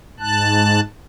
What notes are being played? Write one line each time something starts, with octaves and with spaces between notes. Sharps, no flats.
G#2 A5 F#6